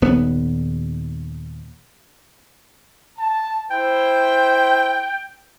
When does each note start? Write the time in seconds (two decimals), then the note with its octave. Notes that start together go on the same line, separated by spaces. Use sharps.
0.02 D#1 B3
3.18 A5
3.71 E4 C5 G5